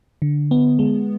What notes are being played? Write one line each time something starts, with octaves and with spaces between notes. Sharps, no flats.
D3
B3
G#3